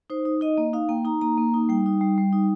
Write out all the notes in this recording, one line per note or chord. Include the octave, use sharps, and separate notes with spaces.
D#4 C5
D#4
D#4 D#5
A#3
D#4 F5
A#3 G5
D#4 A#5
A#3 A#5
A#3
D#4
G3 G5
D#4
G3
G3
D#4